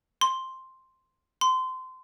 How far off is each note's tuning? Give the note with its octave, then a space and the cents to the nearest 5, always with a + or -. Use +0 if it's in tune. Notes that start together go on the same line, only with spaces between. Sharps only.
C6 +0
C6 -25